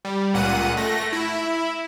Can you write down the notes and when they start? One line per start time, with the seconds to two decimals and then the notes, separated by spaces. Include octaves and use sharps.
0.05 G3
0.34 C#2 A#2 F#5 D#7
0.77 A3 A#6
1.13 E4